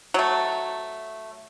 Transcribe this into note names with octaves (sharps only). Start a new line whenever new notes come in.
F#3 A3